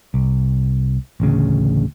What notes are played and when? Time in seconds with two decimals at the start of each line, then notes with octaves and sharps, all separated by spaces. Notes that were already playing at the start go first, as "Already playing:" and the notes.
0.14 C2
1.20 A1 D2 C#3